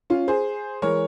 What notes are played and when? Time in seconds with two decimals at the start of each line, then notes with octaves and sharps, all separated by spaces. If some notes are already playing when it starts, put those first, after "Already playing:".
0.10 C#4 F4
0.28 G#4 C5
0.82 E3 G#3 A#4 C#5